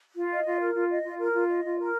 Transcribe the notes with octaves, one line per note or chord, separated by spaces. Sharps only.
F4
D#5
F4
A#4
F4
D#5
F4
A#4
F4
D#5
F4
A#4